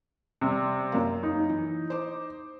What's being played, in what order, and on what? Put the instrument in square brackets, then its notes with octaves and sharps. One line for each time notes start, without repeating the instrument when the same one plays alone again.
[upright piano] C3 G3
[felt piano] F#2 A#3
[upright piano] D#4
[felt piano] E3
C5 D6